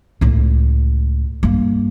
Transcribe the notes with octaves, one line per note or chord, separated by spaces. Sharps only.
C#2 A2
G2 A#3